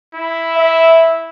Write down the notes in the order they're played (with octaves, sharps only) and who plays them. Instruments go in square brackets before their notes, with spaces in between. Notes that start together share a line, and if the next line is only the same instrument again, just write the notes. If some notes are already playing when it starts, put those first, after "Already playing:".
[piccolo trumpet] E4
[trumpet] E5